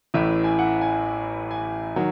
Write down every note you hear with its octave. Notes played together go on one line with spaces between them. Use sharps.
A1 A2 E3 E5
G#5
F#5
G#5
G#5
D#3 F#3